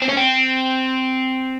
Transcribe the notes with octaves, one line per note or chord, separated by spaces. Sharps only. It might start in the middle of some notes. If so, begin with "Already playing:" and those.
C4
C#4
C4